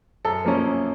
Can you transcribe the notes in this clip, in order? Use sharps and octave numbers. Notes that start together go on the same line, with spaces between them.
F#2 A4
F3 A#3 C#4
F#2